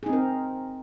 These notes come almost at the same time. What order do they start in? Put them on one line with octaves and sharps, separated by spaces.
G#4 D#4 C4 A#4